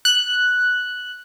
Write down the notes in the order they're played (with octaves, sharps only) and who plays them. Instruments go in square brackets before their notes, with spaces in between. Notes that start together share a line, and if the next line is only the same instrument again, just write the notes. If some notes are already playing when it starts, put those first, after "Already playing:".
[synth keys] F#6